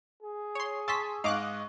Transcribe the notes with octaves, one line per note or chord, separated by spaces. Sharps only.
G#4
C#5 C6
G#5 A5 C6 C#6 E6 B6
G#2 D#5 F5 C#6 D6 F#6